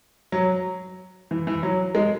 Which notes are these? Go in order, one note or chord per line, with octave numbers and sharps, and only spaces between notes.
F#3
E3
E3
F#3
G#3